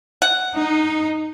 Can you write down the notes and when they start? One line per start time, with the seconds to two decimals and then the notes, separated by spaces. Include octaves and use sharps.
0.22 F#5
0.56 D#4